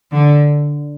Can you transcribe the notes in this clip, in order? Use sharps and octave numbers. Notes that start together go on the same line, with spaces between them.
D3